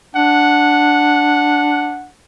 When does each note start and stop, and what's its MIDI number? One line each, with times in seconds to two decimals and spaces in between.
0.16 2.06 62
0.16 2.09 78